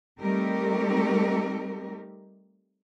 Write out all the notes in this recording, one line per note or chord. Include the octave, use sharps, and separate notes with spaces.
G3 A3 C4 D#4 G4 A#4